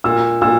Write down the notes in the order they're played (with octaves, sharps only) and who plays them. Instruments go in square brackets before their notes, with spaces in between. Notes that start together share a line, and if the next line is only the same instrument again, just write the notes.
[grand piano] A#2 [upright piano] E6
[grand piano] A#2 [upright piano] E6